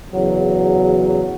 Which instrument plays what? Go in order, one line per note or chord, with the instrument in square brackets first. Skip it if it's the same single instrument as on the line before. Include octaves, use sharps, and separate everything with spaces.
[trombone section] E2 C#3 F#3